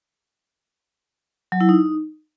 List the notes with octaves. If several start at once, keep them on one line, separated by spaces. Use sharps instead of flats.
F#3
E4
D#4